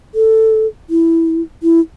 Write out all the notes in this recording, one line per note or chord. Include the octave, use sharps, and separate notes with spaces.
A4
E4
E4